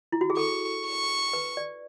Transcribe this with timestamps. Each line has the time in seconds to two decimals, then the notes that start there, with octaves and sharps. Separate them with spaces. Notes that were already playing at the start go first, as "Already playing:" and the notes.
0.12 E4
0.21 F#4
0.30 G#4
0.37 A4 C#6
0.86 C#6
1.33 B4
1.57 D5